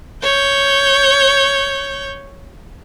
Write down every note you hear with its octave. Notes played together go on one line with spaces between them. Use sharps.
C#5 G6